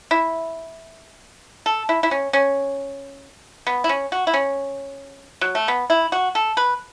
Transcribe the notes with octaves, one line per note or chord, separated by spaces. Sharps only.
E4
A4
E4
E4
C#4
C#4
B3
E4
C#4
F#4
E4
C#4
F#3
A3
B3
E4
F#4
A4
B4